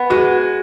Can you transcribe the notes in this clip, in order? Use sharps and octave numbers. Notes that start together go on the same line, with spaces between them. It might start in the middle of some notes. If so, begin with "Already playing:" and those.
Already playing: B3
G#3 F#4